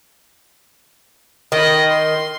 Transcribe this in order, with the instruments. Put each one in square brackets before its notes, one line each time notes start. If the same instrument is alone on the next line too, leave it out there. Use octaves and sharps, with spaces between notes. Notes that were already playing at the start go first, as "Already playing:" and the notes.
[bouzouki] D#3 [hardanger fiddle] D#5 B5
[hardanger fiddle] C6